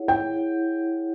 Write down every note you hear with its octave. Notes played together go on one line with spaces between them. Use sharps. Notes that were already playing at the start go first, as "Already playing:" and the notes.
Already playing: E4 G#4 C#5 F#5
G5
E4 G#4 C#5 F#5